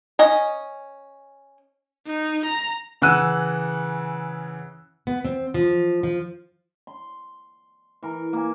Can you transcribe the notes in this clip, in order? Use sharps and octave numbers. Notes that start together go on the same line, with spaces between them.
C#4 D#5 G#5
D#4
A#5
C#3 E3 F#5 E6 F#6 D#7
B3
C4
F3
F3
C6
E3 A#4
A#3 G#5